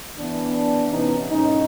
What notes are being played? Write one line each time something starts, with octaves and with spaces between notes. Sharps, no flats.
E3 B3 D4
C3 E3 B3 C#4 D#4
C2 A2 C#4 D#4